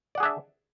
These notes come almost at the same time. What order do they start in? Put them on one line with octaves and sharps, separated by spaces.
D5 F#5 G#4 D4 E5